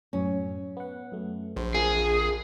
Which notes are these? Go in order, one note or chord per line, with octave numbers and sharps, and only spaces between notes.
F#2 A2 C#4
B3 F#5
F#2 A3
A#1 C5
F2 F4 G#4 A#4 F6